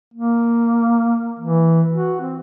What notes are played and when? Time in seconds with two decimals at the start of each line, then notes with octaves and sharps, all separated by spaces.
0.14 A#3
1.40 E3
1.93 F#4
2.21 C4